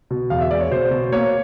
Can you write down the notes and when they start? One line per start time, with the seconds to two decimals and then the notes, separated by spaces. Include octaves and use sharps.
0.11 B2
0.30 E2 F5
0.41 E5
0.51 G#3 D5
0.61 C#5
0.71 B2 C5
0.91 B2
1.12 A#3 C#5